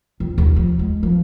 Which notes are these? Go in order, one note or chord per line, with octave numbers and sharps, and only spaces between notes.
F2
D#2
F3
G#3
F3